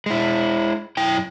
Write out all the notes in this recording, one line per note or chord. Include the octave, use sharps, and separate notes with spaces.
G#3 E4
F#2 E4 G5